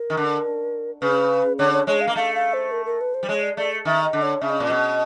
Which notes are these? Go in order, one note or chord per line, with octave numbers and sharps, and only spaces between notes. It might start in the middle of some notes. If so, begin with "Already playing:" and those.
Already playing: A#4
D#3
D3
C#3 B4
D3 C#5
C#5
G#3 C#5
F5
A#3
A3 F5
F5
C5
A#4
A#4
B4
C5
G3
G#3 C#5
D5
A3 D5
D#3 E5
D#5
D3
C#5
C#3 E5
D#5
A#2 D5
B2 D#5